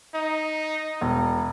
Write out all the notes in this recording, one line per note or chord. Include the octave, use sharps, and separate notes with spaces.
D#4
E1